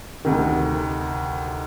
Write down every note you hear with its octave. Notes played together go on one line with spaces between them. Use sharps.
D2 C3 D#3